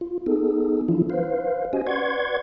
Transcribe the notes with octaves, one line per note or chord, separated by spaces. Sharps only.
F4
B3 D#4 G#4 A4
E3 F3 D4 E4 F4
B4 C5 F5
C#4 F#4 G4 C5 D#5 G#5
B4 D5 F#5 C6 C#6 G#6